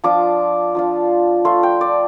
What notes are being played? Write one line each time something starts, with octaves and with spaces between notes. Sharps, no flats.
F3 D4 F4 D6
F3 D4 F4
A3 F4 C6
G5
D5